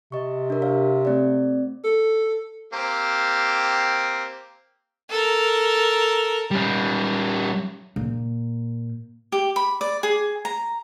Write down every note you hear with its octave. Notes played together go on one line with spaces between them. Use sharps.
C3 D#5 C#6
D4 G4 A#4
C#5 F5
A3 C4 D5
A4
A#3 C4 G4
A4 A#4
G3 C#4
A#2
G4
B5
D5
G#4
A#5